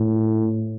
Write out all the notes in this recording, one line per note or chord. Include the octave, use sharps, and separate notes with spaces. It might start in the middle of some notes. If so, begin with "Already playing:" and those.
Already playing: A2